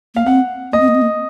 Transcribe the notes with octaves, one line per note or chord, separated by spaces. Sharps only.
A#3 F5
C4 F#5
A#3 D#5
C4
A#3
C4
A#3